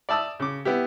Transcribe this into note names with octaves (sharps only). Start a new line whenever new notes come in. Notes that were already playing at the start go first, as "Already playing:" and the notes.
D5 E5 A5 D#6 E6
C#3 D6
B3 E4 G4